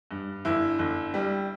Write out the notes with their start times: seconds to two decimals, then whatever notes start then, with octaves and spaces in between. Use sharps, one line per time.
0.11 G2
0.45 G1 E4
0.79 G1
1.14 G3